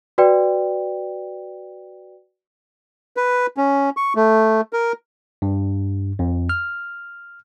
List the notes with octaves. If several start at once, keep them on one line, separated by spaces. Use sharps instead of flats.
F#4 B4 D5 G5
B4
C#4
C#6
A3
A#4
G2
F2
F6